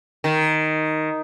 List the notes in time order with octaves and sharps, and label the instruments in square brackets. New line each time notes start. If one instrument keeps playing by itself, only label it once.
[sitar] D#3